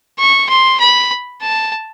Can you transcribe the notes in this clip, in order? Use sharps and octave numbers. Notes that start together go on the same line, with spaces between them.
C#6
C6
B5
A5